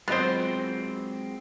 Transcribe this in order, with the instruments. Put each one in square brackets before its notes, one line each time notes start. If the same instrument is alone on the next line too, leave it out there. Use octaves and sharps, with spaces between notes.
[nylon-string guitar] F#3 F4 D#5 [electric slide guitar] G#3 C4 [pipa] B3 C5